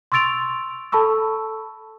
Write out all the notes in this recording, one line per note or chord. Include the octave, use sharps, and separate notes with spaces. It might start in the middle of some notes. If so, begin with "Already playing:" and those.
C6 C#6 E6 A6 D7 F7
A4 A5 B5 C#6 E6